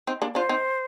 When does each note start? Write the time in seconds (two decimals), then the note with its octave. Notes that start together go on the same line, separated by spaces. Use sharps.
0.07 C4 D#4
0.22 A#3 D4
0.35 D4 F4 C5
0.49 C4 D#4